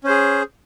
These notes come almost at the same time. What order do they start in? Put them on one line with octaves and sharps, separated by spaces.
C#4 C5 G#4